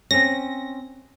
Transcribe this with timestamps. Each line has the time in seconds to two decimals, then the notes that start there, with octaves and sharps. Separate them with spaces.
0.11 C4 C#4 A#6